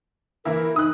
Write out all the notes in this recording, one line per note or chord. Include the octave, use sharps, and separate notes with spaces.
E3 A#3 E4 A#4
D#4 D#6 F#6